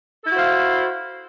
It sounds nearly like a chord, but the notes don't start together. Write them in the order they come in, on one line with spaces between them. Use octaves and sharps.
A4 E4 F#4 C5 F5